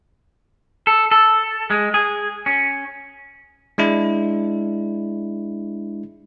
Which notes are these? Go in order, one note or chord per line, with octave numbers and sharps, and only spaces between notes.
A4
A4
G#3
G#4
C#4
G#3 D4 E4